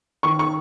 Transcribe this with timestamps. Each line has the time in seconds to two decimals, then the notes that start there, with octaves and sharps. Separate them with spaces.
0.23 D#3 C#6
0.39 C#6